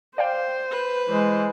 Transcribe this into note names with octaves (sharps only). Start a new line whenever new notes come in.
C5 D5 F5 G5
B4
E3 G#3 C5